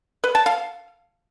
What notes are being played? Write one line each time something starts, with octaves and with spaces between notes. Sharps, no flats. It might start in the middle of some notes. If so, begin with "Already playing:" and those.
B4
A5
F5